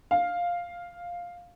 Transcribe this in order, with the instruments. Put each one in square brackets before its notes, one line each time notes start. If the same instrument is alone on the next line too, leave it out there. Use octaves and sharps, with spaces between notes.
[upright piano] F5